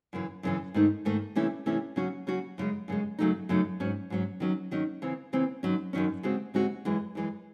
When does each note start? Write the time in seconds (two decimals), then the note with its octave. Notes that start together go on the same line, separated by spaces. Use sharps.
0.13 F#2 C#3 E3
0.43 F#2 C#3 E3
0.74 G#2 D#3 A3 D#4
1.05 G#2 D#3 A3 D#4
1.36 C3 E3 A3 C#4 E4
1.66 C3 E3 A3 C#4 E4
1.96 C#3 F#3 C#4 F#4
2.27 C#3 F#3 C#4 F#4
2.58 F#2 C#3 G#3
2.88 F#2 C#3 G#3
3.19 F#2 C#3 F#3 A3 D#4
3.49 F#2 C#3 F#3 A3 D#4
3.80 G#2 F#3 C#4
4.10 G#2 F#3 C#4
4.40 D#3 F#3 C#4
4.71 D#3 F#3 C#4
5.02 C#3 E3 C4
5.33 C#3 E3 C4
5.63 F#2 D#3 F#3 C#4
5.93 F#2 D#3 F#3 C#4
6.23 C#3 G#3 C4 F#4
6.54 C#3 G#3 C4 F#4
6.85 F#2 E3 G#3
7.15 F#2 E3 G#3